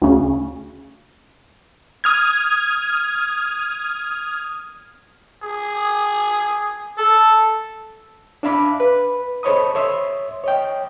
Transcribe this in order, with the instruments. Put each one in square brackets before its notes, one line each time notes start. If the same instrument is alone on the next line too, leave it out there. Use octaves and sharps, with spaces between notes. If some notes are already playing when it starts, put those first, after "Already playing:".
[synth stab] D2 C#3
[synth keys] D#6 F6 G#6
[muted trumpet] G#4
[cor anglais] A4
[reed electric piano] D4 E5 F5 B5 D6
B4
A4 C5 C#5 D#5 B5 D#6
C#5 E5 C6 D#6
C#5 D#5 G5